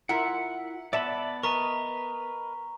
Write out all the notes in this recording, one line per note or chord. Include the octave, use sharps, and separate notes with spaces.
E4 F4 A#4 F#5
B3 D5 E5 A5 B5
A#4 B4 D#5 A#5 C#6